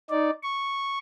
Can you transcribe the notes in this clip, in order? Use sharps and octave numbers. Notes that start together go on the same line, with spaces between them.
D#4 D5
C#6